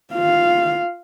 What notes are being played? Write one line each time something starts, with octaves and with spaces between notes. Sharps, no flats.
F4 F5